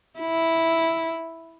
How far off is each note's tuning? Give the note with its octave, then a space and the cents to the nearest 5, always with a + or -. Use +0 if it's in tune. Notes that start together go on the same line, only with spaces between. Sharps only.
E4 -5